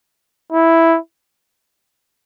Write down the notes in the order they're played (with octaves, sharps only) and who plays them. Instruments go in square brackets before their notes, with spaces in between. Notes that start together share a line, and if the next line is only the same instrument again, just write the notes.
[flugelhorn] E4